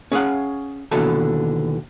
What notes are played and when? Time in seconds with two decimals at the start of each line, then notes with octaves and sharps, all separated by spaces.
0.12 C#4 G#4 F5 F#5
0.91 D#2 B2 D3 E3 A4 A5